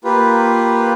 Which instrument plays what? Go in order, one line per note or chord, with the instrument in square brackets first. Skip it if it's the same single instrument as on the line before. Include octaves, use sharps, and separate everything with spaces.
[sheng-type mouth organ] A#3 F4 G4 B4